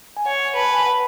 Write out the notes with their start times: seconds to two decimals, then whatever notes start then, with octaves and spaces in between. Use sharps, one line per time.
0.17 G#5
0.26 C#5 F#5
0.56 B4 A5
0.71 G#5
0.86 F#5